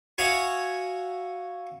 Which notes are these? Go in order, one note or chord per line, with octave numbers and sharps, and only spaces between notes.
F#4 C#5 E5 F5 G#5 D#6